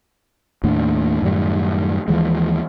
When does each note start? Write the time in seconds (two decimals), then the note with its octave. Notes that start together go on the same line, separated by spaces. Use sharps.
0.63 D#2 A2 D4
1.22 F#2 A2 D#3 G3
2.08 D#2 E3 F3 G#3